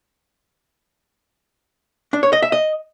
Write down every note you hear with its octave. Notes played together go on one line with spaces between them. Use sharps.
D4
C#5
D#5
E5
D#5